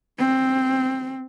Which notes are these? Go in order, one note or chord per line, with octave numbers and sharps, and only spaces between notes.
C4